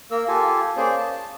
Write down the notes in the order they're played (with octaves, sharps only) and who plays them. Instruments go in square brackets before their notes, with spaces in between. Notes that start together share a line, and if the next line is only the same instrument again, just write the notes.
[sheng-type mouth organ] A#3 A#4 E6
F4 G4 A4 G#5
A#3 C#4 G#4 C5 D5
A5